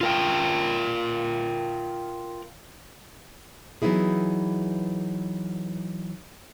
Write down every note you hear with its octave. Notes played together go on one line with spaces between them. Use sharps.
F4 A#4 G5
E3 F#3 B3 D#4 E4 G#4